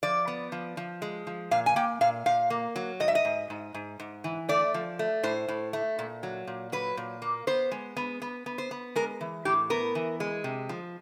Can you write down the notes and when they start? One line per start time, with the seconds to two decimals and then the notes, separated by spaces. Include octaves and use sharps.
0.03 F3 D5
0.28 B3
0.52 F3
0.77 F3
1.02 G#3
1.27 F3
1.51 A#2 F5
1.66 G#5
1.76 A#3 G5
2.01 A#2 F5
2.26 A#2 F5
2.50 A#3
2.76 F#3
3.00 G#2 D#5
3.08 E5
3.15 D#5
3.25 G#2
3.50 G#2
3.74 G#2
4.00 G#2
4.24 E3
4.49 A3 D5
4.74 F3
4.99 A3
5.23 A2 C5
5.48 A2
5.73 A3
5.99 A#2
6.23 F#3
6.47 A#2
6.72 F#3 B4
6.97 A#2
7.22 A#3
7.47 B3 C5
7.72 G#3
7.97 B3
8.22 B3
8.46 B3
8.58 C5
8.71 B3
8.96 G#3 A#4
9.21 E3
9.45 A2 G4
9.70 B3 A#4
9.95 E3
10.20 G#3
10.44 C3
10.69 F3